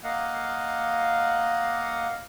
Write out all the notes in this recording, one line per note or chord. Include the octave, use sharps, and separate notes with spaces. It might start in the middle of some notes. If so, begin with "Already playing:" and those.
A#3 D#5 F5 F#5